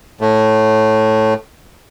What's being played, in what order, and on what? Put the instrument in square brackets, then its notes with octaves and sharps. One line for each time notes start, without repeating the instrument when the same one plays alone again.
[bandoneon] A2 A3